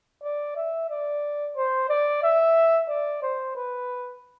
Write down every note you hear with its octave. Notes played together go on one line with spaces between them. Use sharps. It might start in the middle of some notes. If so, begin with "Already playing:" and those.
D5
E5
D5
C5
D5
E5
D5
C5
B4